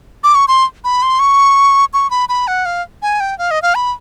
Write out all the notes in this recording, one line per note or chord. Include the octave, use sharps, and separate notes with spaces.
D6
C#6
C6
B5
C6
C#6
C#6
B5
B5
F#5
F5
G#5
G5
F5
D#5
F5
B5